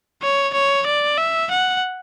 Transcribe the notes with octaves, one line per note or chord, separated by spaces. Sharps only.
C#5
C#5
D5
E5
F#5